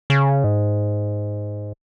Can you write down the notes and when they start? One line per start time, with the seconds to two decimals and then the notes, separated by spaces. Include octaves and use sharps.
0.10 C#3
0.44 G#2